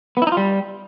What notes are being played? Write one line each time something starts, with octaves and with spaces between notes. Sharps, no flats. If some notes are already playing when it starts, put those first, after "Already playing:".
B3
E4
D#4
F4
G3